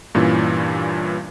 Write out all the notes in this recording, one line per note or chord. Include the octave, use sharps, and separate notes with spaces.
G2 A#2 E3 C#4